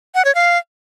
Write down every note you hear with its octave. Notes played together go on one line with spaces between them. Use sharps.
F#5
C#5
F5